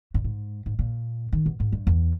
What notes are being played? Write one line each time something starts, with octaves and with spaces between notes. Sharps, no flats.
G2
G#2
G#2
A#2
D#3
B2
G#2
G2
E2